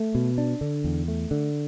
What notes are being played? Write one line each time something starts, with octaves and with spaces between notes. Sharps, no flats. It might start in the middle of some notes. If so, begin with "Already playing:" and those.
Already playing: A3
B2
D4
D3
E2
A3
D3